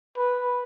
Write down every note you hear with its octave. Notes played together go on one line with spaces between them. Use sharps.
B4